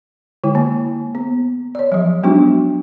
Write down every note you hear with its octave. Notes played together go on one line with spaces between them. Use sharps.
D3 G#3 E4
A#3
B3
C#5 D5
F3 F#3
F#3 G#3 B3 D4 D#4 F#4